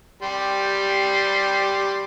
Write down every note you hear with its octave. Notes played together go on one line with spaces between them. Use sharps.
G3 G4 C6